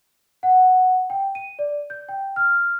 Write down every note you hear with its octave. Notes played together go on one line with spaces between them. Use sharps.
F#5
G5
D#7
D5
G6
G5
F6